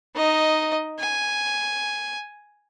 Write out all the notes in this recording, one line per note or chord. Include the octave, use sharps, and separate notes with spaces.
D#4 D#5
G#5